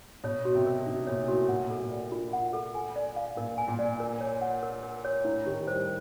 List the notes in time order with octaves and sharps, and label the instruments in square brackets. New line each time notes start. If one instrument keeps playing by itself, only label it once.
[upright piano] B2 [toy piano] C#5
[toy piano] F#4
[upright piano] C3
[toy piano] A#4
[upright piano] C3 [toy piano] D#4
[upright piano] A#2 [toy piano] C#5
[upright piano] A2 [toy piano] F#4
[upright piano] A#2 [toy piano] F#5
[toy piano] A4
[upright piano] A#2
[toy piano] D5
F4
F#5
A4
G#5
D5
F5
[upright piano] A#2 [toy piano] A#4
[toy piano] G#5
[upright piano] A#2
[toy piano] D5
A#4
C#5
F#5
A#4
A#4
C#5
[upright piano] A2 [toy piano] E4
[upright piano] D#3 [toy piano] G4
[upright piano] G3 [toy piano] C5